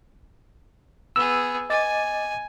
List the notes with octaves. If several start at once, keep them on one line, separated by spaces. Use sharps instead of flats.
B3 G#4 E6
D#5 G#5 D6 A6